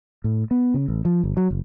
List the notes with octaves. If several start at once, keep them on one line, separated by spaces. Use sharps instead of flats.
A2
B3
C#3
A1
F3
G1
F#3
F#1